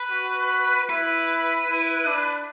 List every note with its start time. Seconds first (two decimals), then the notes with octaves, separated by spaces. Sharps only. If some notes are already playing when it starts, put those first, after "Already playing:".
Already playing: B4
0.11 F#4
0.89 E4 B4
1.68 E4
2.06 D4